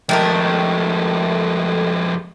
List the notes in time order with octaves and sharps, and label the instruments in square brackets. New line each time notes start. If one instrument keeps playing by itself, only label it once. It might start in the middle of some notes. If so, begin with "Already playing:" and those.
[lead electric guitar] F2 G#3 [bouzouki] D#3 A3 A#4